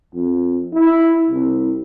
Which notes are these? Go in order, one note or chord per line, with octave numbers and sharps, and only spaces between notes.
F2
E4
C2